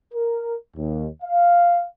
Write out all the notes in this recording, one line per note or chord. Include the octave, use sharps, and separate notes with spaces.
A#4
D#2
F5